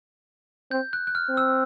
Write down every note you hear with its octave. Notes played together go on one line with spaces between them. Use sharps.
C4 G6
F#6
F#6
F6
C4
E6